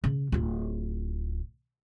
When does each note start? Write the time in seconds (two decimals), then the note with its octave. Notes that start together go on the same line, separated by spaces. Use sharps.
0.04 C#3
0.32 D1 F4